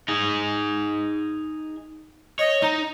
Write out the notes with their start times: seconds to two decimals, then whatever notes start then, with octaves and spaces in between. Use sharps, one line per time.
0.08 D#4 G#4
2.39 C#5 D#5
2.62 D#4 A#5